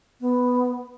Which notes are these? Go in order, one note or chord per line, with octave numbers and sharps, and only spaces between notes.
B3